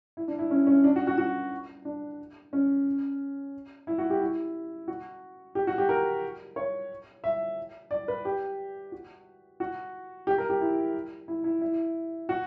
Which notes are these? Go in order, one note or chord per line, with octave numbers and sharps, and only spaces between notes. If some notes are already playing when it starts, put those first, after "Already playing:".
E4
D4
E4
C#4
C#4
D4
F#4
F#4
F#4
D4
C#4
E4
F#4
G4
E4
F#4
G4
F#4
G4
A#4
C#5
E5
D5
B4
G4
F#4
F#4
G4
A#4
G4
E4
E4
E4
E4
F#4